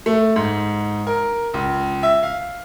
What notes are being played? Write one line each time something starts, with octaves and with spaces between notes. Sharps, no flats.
A3
G#2
A#4
C#2
E5
F5